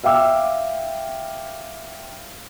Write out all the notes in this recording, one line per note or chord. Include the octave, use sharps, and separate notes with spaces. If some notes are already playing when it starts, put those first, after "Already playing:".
E5 F5 G5 D6 E6